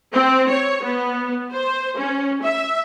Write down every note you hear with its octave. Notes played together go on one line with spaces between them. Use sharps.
C4
C#5
B3
C5
C#4
E5